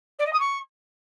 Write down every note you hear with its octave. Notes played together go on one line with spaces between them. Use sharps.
D5
D#5
D#6
C#6